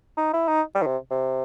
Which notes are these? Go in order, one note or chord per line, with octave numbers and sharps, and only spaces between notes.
D#4
E4
D#4
G3
D#3
C3
C3